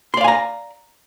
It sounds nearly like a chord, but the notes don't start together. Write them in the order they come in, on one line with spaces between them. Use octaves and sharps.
C6 D5 F5 G#5 A#5